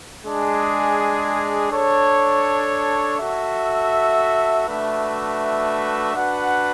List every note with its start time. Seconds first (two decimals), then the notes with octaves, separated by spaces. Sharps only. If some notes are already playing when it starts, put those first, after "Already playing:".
0.23 G#3 D4 G#4
1.70 D4 A4 C#5
3.18 F#4 A4 E5
4.67 A3 D4 F#4 B4 E5
6.15 D4 F#4 B4 F#5